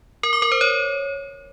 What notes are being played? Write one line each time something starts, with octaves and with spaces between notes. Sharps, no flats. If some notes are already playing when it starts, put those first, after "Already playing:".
A#4
D6
A#4
C5
C#5